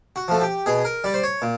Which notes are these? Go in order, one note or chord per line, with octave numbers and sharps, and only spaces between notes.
F#4
F3 A3
G4
B2 G#4
A#4
G3 D5
C5
C#5
A#2